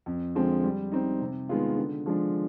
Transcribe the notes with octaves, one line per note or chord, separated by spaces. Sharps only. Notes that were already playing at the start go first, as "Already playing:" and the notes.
F2
D3 F3 G#3 C4
G3
C4 D#4
C3
D#3 G#3 B3 F4
D3
F3 G#3 D4